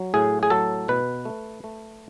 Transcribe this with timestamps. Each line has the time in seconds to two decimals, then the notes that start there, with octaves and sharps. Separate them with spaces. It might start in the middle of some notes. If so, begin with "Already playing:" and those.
Already playing: F#3
0.14 A2 G#4
0.43 G#4
0.50 F#3 A4
0.88 B2 B4
1.25 A3
1.64 A3